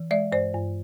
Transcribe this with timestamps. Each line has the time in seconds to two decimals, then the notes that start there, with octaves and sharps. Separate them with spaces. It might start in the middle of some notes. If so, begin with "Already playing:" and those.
Already playing: E3
0.11 G#3 D5 E5
0.32 G2 C5 D5
0.54 G2